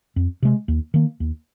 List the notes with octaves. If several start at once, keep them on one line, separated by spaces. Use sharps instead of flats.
F2
C3 G#3
D#2
D#3 A#3
D#2